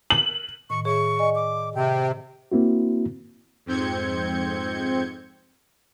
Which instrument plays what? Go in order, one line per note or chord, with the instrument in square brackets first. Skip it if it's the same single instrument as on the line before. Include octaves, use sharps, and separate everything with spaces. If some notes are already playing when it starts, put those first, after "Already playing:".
[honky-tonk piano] F#7
[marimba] A2 D#3 [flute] C#6
[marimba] G#4 C#5 E5 [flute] C#6
[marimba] D5 D#5 G#5
[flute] D6
[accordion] C3 [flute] G5
[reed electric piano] A#3 C4 E4 F#4
[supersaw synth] F2 G#2 C4 G6 G#6 C#7